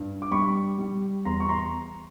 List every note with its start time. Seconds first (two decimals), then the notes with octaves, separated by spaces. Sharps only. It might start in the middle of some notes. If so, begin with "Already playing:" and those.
Already playing: G2
0.22 D6
0.31 G3 B5 C#6
0.78 G3
1.25 E2 A#5 C6
1.40 C#6
1.49 A#5 C6